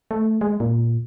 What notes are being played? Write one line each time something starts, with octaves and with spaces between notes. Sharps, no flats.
A3
G#3
A#2